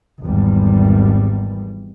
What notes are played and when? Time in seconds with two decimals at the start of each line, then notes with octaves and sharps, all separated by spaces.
0.23 G#1 E2 G3